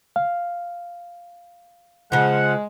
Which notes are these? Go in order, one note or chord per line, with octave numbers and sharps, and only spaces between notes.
F5
C#3 F3 G#3 F#5